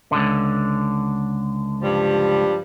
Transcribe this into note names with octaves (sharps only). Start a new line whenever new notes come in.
C#2 D3
G2 F3 G3